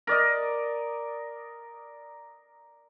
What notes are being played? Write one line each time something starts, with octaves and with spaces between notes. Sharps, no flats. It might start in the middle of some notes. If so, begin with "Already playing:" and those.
A#4 D5 D#5